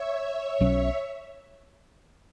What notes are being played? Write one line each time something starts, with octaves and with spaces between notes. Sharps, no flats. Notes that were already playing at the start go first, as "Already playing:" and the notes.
Already playing: C#5 E5
B1 B2 F#3 C#4